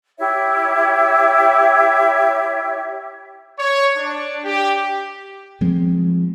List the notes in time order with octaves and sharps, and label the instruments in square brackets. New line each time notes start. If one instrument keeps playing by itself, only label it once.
[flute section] E4 G4 C#5 E5
[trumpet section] C#5
D4
G4
[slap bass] F3 G#3 C4